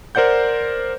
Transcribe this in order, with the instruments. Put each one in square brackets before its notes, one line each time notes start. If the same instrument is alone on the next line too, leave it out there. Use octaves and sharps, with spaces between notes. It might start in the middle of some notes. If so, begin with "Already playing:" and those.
[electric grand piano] A#4 C5 D5 F#5 G6